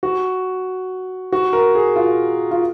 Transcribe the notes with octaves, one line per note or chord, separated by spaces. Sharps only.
F#4
F#4
A#4
G#4
F4
F4